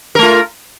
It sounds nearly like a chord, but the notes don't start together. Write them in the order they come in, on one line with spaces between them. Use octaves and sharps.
A#4 A3 F4